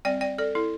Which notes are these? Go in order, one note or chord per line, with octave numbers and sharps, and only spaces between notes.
G3 C4 D5 G5
D5 G5
A4 D5
E4 A4